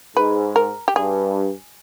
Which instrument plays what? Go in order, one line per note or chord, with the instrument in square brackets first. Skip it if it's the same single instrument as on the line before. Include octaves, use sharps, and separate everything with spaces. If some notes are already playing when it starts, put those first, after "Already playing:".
[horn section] G#2 [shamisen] B4
[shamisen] A#4
G4
[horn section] G2 [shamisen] G#4